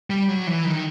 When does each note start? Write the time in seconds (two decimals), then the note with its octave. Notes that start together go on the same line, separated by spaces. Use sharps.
0.10 G3
0.28 F#3
0.47 E3
0.65 D#3